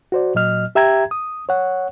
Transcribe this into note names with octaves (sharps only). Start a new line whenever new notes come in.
F#4 C5 D5
A#2 F#3 D#5 F6
G4 E5 G5 A#5 G#6
D#6
C#5 F#5